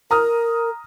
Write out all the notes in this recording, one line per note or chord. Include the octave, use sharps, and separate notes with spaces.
A#4 A#5 D#6 F6